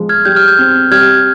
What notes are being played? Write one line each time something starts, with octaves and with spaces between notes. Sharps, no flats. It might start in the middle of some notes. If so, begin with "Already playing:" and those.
Already playing: F3 G#3
F6 G#6
G3 G6
F6
G6
C4
G3 F6 G#6